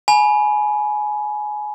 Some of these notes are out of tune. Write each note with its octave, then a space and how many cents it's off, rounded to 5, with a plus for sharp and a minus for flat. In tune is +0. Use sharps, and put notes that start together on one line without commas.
G#5 +20 B5 -20